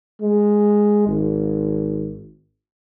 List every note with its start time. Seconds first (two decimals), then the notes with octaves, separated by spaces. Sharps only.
0.21 G#3
1.07 G#1